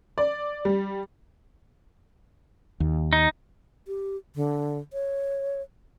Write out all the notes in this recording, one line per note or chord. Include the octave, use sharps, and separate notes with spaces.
D5
G3
D#2
D#4
G4
D3
C#5